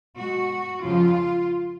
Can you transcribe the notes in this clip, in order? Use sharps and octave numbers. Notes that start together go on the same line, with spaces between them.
B2 G#3 F#4
F2 C#3 F3 G#3 F4